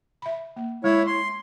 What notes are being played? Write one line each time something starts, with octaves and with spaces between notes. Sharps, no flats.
E5 B5
A#3
G#3 E4 C#5
C6